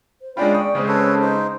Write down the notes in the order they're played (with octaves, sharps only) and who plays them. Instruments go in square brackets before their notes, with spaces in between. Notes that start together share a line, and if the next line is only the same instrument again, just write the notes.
[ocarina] C5
[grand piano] G#3 D4 F4 [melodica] C#4 G5 B5 [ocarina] D5
[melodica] G5 [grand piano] C#6 D#6
[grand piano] C#3 G#3 C4 [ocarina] C#4
[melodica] A4 B4 C#5
D#4 C5